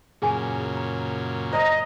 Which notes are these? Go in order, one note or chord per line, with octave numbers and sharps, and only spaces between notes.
F#2 A#2 C#3 G#4 G#5
A#5
C5 D5 D#5 A#5